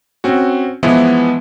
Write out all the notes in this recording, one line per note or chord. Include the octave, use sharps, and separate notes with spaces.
C4 C#4 F#4
E3 F3 G#3 B3 E4